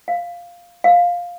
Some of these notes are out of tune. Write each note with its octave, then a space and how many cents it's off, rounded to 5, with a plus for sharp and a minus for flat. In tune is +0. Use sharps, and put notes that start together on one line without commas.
F5 +0
F5 +10